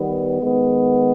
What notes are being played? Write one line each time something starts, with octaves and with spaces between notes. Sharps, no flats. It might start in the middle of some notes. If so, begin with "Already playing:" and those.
Already playing: D#3 G3 B3
D#3 G#3 B3